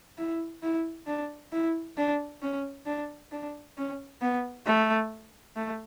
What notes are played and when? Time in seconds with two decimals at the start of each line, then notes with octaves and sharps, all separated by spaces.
0.18 E4
0.63 E4
1.07 D4
1.52 E4
1.97 D4
2.42 C#4
2.86 D4
3.32 D4
3.77 C#4
4.21 B3
4.67 A3
5.56 A3